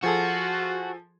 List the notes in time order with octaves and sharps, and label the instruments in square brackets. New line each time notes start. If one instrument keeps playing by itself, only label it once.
[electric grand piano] F3 G#4 A4 [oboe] F4 [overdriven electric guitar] F#4